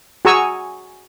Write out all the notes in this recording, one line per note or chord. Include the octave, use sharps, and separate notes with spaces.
F#4 G#4 G#5 A#5 C#6 E6